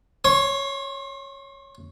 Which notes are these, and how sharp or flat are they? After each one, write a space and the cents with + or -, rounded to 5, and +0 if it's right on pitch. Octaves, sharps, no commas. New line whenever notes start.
C#5 +0 C6 +35